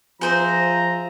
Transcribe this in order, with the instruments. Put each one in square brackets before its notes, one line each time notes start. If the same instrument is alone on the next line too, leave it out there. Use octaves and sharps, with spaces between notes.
[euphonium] F3 [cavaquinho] G#4 C5 E5 [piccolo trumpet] A#5